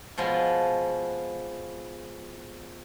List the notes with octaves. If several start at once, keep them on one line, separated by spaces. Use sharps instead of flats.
B2 F3 G#3 B3